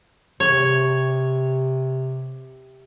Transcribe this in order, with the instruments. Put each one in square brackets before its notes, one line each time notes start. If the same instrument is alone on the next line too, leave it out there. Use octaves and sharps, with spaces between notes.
[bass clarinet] C3 [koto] C#5